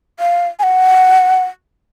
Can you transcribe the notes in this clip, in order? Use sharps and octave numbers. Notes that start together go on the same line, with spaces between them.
F5
G#5
F#5